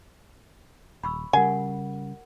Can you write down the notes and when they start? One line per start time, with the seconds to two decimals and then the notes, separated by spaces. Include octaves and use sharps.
1.04 D#1 B5 C#6 E6
1.33 C#3 G3 G4 A#4 F#5 G#5